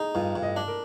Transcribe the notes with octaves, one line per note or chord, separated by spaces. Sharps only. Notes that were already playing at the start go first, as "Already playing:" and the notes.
Already playing: D#4 G#4
G2 F4
G2
D#5
D4
A#4